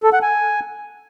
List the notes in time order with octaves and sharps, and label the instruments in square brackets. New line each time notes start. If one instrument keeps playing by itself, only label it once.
[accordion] A4
F#5
G#5